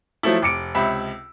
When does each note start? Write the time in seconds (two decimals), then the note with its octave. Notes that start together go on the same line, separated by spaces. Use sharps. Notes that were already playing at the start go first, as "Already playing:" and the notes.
0.23 F3 F#3 A3 E4
0.42 F1 D6 C#7 D7
0.75 C#2 C3 E5 B5 E6